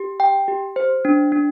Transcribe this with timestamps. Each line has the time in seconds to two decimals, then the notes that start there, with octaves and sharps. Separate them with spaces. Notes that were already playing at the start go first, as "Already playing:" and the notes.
Already playing: G4
0.20 G5
0.48 G4
0.76 C5
1.05 D4
1.32 D4